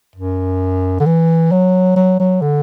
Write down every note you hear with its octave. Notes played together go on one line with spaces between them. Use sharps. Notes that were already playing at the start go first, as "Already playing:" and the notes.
F#2
D3
E3
F#3
F#3
F#3
D3